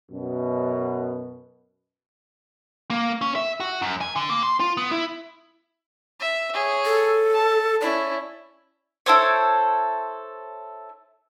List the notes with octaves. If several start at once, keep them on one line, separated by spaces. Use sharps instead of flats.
F#2 B2
A#3
C#4
E5
F#4
F#2
G#5
D3
A#3
C6
F4
B3
E4
E5
G#4 C#5
A4
A5
C#4 E4 D5
E4 A4 C5 C#5